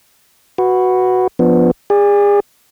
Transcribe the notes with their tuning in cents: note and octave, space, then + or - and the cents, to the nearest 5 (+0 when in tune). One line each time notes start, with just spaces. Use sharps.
F#4 +0 B4 +0
F3 +0 B3 +0 D4 +0
G#4 -35 D5 +0